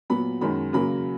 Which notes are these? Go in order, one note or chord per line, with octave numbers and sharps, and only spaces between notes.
A#2 F#3 B3 B5
F#2 D#3 G#3 C#4 B5
C#3 F#3 A#3 B5